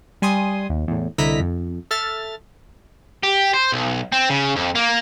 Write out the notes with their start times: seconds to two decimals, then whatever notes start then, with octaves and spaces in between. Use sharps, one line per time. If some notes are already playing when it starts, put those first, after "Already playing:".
0.22 G3 G#5 C6 D#6
0.69 D#2
0.88 E2 A2
1.18 C2 D3 E4 D#5 A#5 B6
1.40 F2
1.91 A4 E5 F6 A6
3.23 G4
3.53 C5
3.72 B1
4.12 C4
4.29 C#3
4.56 F2
4.75 A#3